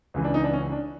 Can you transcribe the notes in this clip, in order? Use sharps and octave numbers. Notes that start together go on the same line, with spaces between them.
C#2 C#3 E3
D4
D#4
D4
C#4
D4